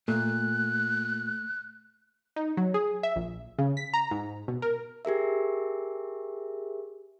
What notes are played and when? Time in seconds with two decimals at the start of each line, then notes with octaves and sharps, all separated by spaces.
0.08 A#2 A3 F#6
2.36 D#4
2.57 F#3
2.74 G#4
3.03 E5
3.16 A#1
3.59 C#3
3.77 B6
3.94 A#5
4.11 G#2
4.48 B2
4.62 A#4
5.05 G4 G#4 A#4 E5